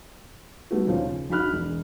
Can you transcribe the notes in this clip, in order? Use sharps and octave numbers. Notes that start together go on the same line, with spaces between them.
G3 A3 B3 F#4
D#2 D#3 F3 C#4
C#3
A#1 F#4 B5 F6 F#6
E1